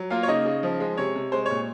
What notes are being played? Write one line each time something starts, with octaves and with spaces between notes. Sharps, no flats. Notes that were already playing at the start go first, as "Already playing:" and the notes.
Already playing: F#3
A#3 F4 F5
C#5
C#3 D#4 D#5
C#3
F3
G#3
C3 C#5
C3
G#3 C5
A#2 C#5